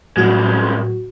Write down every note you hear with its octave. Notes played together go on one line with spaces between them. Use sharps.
C2 A2 F#3 G#3 F#4